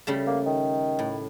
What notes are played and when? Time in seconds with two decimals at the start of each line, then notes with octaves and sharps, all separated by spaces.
0.07 C#3 G3 A3
0.27 A#3
0.46 D#3
0.99 A2